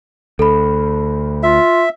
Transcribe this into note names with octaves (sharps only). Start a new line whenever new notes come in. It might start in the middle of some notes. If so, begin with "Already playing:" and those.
D2 A4 B5
F4 E5